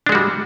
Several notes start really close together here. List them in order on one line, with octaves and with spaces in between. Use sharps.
D4 G#3 F#4 G3